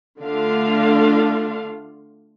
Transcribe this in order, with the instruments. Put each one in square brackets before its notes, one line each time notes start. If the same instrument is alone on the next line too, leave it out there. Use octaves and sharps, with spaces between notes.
[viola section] D3 A3 D4 F4 F5